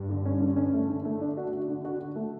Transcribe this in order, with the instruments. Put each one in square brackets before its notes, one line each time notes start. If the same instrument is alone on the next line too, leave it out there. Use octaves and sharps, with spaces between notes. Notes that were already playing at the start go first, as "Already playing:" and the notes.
Already playing: [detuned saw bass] G2
[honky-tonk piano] D3
C#4
D3
C#4
A3
D3
A3
D4
F#4
F#4
D3
F#4
F#4
A3